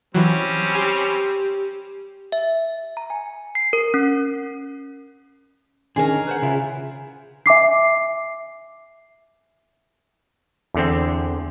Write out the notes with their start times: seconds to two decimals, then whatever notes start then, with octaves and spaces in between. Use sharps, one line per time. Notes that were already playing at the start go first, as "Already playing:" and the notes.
0.14 E3 F#3 G3 C4 C#4
0.75 G4 G#5 C6
2.32 E5
2.97 A#5
3.10 G#5
3.55 C7
3.73 A#4
3.94 C#4
5.96 D3 D#3 C#4 G#4 A#4
6.27 B4 C5 F#5
6.42 C#3 E4 F4
7.46 E5 G#5 D6 C7
10.74 E2 D3 C4